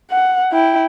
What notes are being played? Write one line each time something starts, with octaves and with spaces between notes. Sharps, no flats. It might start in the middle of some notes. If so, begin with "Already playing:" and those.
F#5
E4 G5